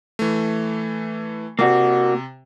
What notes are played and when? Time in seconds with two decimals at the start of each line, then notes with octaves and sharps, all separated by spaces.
0.19 E3 A3
1.59 C3 A#3 F#4